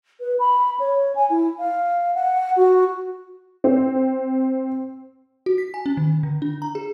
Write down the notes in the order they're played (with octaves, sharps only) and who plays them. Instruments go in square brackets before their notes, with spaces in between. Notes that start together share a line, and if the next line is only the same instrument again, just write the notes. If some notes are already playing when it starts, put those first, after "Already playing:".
[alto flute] B4
B5
C#5
G#5
E4
F5
F#5
F#4
[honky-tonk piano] C4
[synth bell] F#4
B6
G#5
C#4
D#3
D3
D4
A#5
G#4